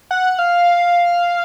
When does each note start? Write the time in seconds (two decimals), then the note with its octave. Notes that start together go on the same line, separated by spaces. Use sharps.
0.11 F#5
0.39 F5